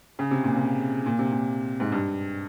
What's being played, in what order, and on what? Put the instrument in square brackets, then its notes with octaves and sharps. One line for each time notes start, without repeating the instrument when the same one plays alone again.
[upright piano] C#3
C3
A#2
C3
A#2
C3
A#2
G#2
G2